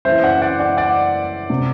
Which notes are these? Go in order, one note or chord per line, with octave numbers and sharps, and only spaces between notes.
F#1 F#2 E3 C5 E5
D5 F#5
D5 F#5
D5 F#5
D5 F#5
C3